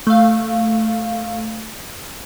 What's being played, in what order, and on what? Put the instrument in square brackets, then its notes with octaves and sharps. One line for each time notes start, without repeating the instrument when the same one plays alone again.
[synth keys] A3 F5